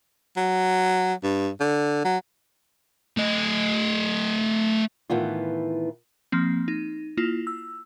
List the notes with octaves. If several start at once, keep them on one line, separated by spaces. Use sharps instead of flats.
F#3
G2
D3
F#3
A3 D#5
A2 D#3 E3 B3 F4
F3 A#3 C4
D#4
A#3 E4 F4
E6